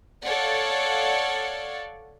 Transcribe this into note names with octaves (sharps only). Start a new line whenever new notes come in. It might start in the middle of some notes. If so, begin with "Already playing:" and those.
A4 C#5 D5 F5 F#5